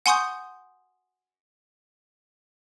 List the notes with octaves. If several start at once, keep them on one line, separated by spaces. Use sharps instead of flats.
F#5 G#5 C6 C#6 D#6 G6